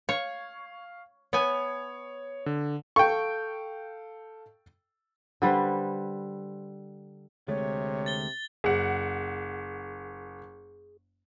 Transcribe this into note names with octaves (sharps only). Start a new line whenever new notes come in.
C#5 F5
B3 C#5 G#5
D3
A4 F5 G5 C#6
D3 G3 B4 C5
D2 C3 G#3 A3 C#5
A6 G7
F#1 G#4 F#5